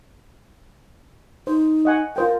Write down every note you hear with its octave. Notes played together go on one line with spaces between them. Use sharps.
D#4 C5
D#5 F#5 G#5
F4 A#4 C5 G5